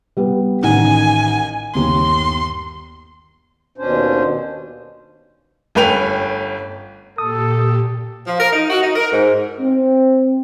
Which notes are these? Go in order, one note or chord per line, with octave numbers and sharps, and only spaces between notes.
G3 B3
A1 D#3 F#5 G#5
G1 D#2 C6
D#2 B2 C#4 D4 C5
G1 A3 C#4 B4 G5 F7
A#2 G4 A4 D#6
F3
A#4
D#4
F#4
D#4
A#4
G#2
C4